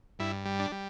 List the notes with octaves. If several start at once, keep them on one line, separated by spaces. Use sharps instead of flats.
G2 E4
G3
D4
G3